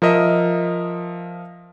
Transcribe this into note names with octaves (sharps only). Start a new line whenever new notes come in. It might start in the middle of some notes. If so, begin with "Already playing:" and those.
F3 A#4 D#5 E5